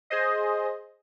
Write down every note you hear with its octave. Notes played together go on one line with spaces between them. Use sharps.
G#4 C5 D#5